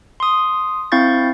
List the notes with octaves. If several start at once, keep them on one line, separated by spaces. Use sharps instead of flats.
C6 D#6
C4 E4 F5 C#6 G6 A6